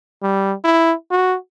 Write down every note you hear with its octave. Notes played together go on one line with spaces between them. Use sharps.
G3
E4
F#4